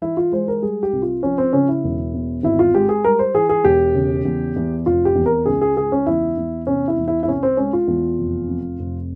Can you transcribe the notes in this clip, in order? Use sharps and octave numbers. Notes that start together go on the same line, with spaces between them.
E3 E4
F4
G#3 C5
A#4
G3 G#4
G4
C2
F4
F3 C#4
C4
C#3 C#4
E4
E1
E2
G#1 E4
F4
G#3 G4
G#4
G3 A#4
C5
E3 G#4
G#4
E1 G4
C#3
E2
E2
F1 F4
G4
E2
A#4
C#2 G#4
G#4
C#2 G#4
C#4
E2 E4
E2
C3 C#4
E4
E2
E4
E4
C2 C#4
C4
G#3 C#4
F4
E2
F1
F2
F1